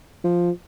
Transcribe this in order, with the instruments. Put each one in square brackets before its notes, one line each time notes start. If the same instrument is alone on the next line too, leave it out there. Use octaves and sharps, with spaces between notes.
[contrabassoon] F3